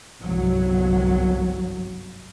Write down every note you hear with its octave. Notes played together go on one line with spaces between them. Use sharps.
G1 C2 G#2 F#3